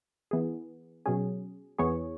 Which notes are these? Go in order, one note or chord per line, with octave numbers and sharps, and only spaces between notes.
E3 B3 G#4
B2 F#3 C#4 G#4
E2 E3 B3 G#4 C#5